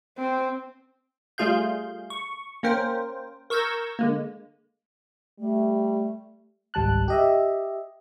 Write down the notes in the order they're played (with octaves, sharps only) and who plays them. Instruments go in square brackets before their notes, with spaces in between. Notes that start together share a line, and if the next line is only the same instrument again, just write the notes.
[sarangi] C4
[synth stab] G3 A3 F4 G#4 F5 G6
C#6
A#3 C#4 A#4 C5 G5
A#4 C#6 E6 G6 G#6 A#6
D3 G#3 A#3
[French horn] G3 [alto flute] A3
[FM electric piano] G#1 C#2 G3 A5 F#6
G4 D#5 E5